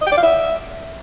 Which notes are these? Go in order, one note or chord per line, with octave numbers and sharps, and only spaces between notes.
D#5
G5
D5
F5
E5